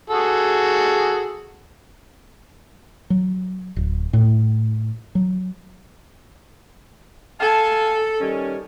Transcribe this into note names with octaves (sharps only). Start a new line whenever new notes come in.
F#4 G#4 A4
F#3
D1
A2
F#3
A4 F5 G#5 A5
D#3 G3 C#4